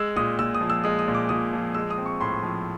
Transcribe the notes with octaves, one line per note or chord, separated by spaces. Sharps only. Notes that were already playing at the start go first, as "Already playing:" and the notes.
Already playing: G#3 E6
A#2 D#6
A#2 E6
D#6
F3
E6
G#3 D#6
D#6
A#2
D6
A#2 D#6
F3
G#3 E6
D#6
C4
C#6
A2 C6
F3